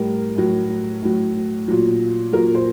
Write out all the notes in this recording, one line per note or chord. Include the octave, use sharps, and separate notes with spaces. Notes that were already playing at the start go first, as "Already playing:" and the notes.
Already playing: A2 G3 A#4
A2 F#3
A2 F#3
A#2 F#3
A#2 F#3 A#4
C5